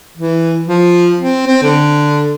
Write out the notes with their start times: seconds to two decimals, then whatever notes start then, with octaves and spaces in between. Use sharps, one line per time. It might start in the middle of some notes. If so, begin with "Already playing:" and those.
0.17 E3
0.68 F3
1.19 C4
1.47 C4
1.63 D3